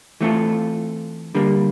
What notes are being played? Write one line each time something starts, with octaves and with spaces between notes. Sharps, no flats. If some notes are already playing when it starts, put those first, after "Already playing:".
E3 A3 C4 F4 A4
D3 G3 A#3